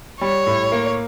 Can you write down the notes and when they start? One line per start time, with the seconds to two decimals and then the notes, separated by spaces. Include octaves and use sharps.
0.21 G3 C#5
0.47 A2
0.72 A#3